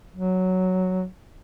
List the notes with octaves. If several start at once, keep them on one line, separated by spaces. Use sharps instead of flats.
F#3